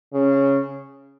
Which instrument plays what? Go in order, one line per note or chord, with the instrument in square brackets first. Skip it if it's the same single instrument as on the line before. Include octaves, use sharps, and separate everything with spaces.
[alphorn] C#3